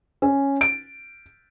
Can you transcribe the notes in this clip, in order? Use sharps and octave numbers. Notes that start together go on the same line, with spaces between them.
C#4
D7